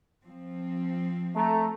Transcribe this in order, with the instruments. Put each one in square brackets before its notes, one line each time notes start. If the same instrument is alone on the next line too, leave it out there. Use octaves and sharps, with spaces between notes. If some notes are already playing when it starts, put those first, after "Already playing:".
[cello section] F3 C4
[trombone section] A3 [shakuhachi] A#5